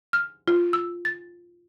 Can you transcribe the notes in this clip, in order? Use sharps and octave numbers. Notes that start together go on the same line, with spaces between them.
F6
F4
E6
A6